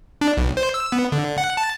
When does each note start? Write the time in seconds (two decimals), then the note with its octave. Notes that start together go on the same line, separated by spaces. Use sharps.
0.21 D4
0.37 B1
0.57 C5
0.74 E6
0.92 B3
1.12 D3
1.38 F#5
1.57 A5